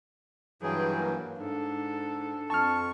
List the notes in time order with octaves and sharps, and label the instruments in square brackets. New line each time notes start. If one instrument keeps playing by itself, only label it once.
[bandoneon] G2 E3 F#3 [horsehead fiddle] G#4 G5
[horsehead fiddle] A#3
[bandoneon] G#2 [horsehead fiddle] D4 A4
[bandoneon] F2 C#6 [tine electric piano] A5 F6